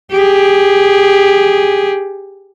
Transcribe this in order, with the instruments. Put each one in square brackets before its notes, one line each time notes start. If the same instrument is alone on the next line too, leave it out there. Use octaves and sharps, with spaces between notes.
[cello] G4 G#4